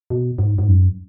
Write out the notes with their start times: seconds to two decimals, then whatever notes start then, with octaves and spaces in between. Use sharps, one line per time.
0.10 B2
0.38 G#2
0.58 G#2
0.68 F#2